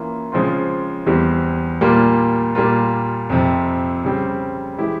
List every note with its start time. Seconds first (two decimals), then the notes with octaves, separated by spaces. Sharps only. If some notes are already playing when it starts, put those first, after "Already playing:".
Already playing: E3 A#3 C#4 F4
0.32 C#3 F3 G#3 C4 F4
1.06 E2 E3 G3 C4 G4
1.81 A#2 G3 A#3 F4
2.55 A#2 G3 A#3 F4
3.30 F2 C3 F3
4.04 C#3 G3 C4
4.78 E3 G#3 E4 G4